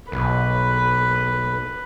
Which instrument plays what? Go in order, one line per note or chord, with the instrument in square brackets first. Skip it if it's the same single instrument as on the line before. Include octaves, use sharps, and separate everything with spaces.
[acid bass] B1 [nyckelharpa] B4